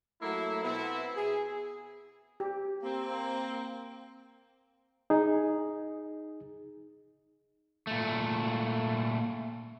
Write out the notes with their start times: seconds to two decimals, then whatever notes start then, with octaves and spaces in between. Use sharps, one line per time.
0.21 F#3 A3 A#3 E4
0.64 B2 B3 C4 E4
1.16 G#4
2.40 G4
2.83 A#3 C4
5.10 D#4 G#4
7.87 A#2 A3